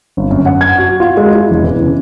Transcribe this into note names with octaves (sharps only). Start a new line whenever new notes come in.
G1
F#2
F#5
G#6
F#4
F4
G#3
E4
E1
E3
C#3